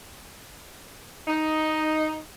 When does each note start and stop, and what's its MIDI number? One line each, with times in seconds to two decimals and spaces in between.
1.27 2.18 63